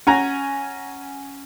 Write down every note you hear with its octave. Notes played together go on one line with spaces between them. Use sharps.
C#4 F#5 G#5 A#5